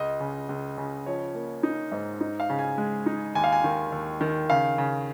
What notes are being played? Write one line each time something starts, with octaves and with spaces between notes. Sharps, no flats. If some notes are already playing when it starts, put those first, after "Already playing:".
Already playing: C#2 D#5
C#3
C#2
C#3
F3 C#5
A#3
D#4
G#2
D#4
F5
C#3
G#5
G#3
D#4
D#2 G#5
F5
G#5
D#3
D#2
D#3
C#3 F5
C#3